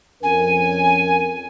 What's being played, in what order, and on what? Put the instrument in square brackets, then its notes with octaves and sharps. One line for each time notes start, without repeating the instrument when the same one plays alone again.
[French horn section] F2 C#4 A#4 [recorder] G#5